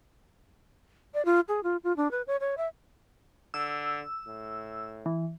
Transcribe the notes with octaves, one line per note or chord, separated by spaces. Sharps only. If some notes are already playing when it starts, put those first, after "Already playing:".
D5
F4
G#4
F4
F4
D4
B4
C#5
C#5
E5
D3 E6
A2
E3